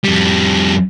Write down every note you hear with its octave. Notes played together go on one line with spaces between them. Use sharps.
F2 G3